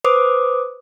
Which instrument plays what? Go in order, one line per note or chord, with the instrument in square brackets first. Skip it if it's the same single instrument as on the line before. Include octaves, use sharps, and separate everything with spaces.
[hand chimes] B4 C5 D6 D#6